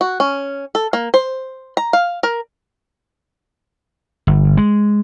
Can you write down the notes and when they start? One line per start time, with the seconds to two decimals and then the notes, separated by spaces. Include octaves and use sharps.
0.01 F#4
0.20 C#4
0.75 A4
0.93 A#3
1.14 C5
1.77 A#5
1.93 F5
2.23 A#4
4.27 G1
4.57 G#3